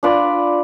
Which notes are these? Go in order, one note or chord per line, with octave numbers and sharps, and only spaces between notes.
D4 F4 B4 D5